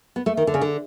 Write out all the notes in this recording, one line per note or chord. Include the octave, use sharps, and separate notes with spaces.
B3
A3
D#3
D3
C#3
D3